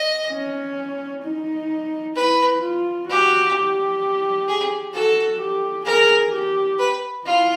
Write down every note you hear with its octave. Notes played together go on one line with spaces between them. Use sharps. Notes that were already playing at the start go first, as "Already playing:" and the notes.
Already playing: D#5
C#4
D#4
E4 B4
F4
F#4 G4
G4
G#4
F#4 A4
G4
G#4 A#4
G4
B4
E4 F4